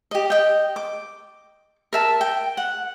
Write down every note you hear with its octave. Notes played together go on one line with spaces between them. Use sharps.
G4 D#5
D#5 G5
D6
A#4 E5 A5
G5
F#5